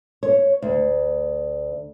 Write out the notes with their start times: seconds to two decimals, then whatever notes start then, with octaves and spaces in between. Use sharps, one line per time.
0.23 C#5
0.62 D2